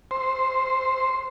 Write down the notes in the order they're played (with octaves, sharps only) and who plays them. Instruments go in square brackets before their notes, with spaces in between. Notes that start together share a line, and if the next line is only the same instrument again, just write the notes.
[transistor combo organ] C5